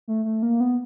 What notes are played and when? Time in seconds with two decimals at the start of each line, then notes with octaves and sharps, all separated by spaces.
0.08 A3
0.25 A3
0.43 A#3
0.60 B3